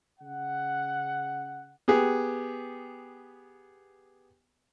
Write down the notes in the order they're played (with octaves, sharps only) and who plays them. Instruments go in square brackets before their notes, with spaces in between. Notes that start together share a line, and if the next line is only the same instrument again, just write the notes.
[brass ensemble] C#3 F#5
[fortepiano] B3 G4 G#4